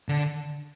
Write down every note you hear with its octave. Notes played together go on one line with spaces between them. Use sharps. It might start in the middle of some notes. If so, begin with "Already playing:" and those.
D3